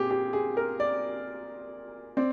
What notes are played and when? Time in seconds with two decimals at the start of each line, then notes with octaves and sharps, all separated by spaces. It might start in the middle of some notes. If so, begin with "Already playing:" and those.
Already playing: A#2 C4 G4 G#4
0.11 G4
0.33 G#4
0.57 A#4
0.80 D5
2.17 C4 D5